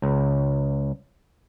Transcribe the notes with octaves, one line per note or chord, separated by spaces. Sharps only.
C#2